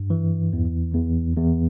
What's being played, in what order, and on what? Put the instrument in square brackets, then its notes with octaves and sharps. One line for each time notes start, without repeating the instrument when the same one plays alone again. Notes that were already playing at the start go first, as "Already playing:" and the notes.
Already playing: [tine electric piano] G2
E3
E2
E2
E2